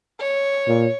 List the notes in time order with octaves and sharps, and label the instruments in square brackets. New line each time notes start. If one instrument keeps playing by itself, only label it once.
[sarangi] C#5
[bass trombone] A#2